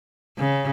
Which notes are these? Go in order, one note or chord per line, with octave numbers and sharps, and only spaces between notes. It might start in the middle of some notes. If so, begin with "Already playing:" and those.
C#3